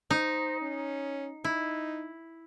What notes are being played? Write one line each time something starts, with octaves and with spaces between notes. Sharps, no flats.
D#4 C5
C#4
D#4 E4